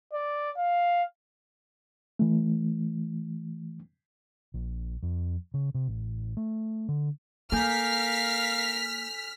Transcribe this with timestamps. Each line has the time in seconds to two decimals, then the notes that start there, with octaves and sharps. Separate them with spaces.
0.13 D5
0.57 F5
2.19 E3 A3
4.54 A#1
5.03 F2
5.54 C#3
5.74 C3
5.87 A1
6.37 A3
6.88 D3
7.52 A#3 A4 A#4 F5 G#5 F6 G6 B6